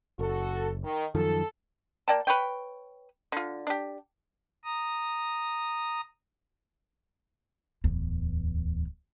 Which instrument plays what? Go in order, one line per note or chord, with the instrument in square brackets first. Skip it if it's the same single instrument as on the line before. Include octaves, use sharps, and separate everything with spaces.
[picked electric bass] F#1 [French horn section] F#4 A4
[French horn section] D#3
[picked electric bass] F#2 D#3 F3 [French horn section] A4
[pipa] A#3 D5 G5 A5
B4 C#5 G5
D3 F4
D4 G4
[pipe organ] A#5 D#6
[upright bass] D1 E2